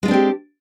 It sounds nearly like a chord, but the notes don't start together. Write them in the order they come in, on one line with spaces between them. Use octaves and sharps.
G#3 F4 D4 C4 G4